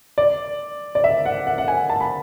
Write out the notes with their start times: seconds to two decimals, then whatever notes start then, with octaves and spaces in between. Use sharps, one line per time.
0.18 D5
0.95 D5
1.04 E5
1.26 F#5
1.47 F#5
1.58 F#5
1.68 G#5
1.90 A5
2.00 B5